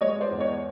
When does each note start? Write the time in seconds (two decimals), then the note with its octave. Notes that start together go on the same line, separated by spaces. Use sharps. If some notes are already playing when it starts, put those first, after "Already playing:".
0.01 G#3 C#5 D#5
0.21 C5 D5
0.31 E2
0.40 C#5 D#5